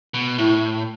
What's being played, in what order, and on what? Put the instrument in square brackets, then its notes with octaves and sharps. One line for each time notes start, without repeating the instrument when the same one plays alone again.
[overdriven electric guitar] B2
[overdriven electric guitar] A2 [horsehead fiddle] E4